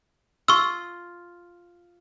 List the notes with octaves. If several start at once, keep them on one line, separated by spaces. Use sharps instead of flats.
F4 C#6 E6